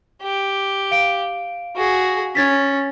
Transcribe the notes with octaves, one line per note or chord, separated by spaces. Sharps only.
G4
F5 D7
F#4 G#4
C#4 G#6 A6 B6